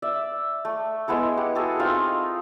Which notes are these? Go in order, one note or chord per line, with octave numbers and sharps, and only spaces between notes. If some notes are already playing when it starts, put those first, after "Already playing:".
D5 E5
A3
G#3 B3 E4 A4
G4 F#5
F#4 G#4 A4
C4 D#4 F4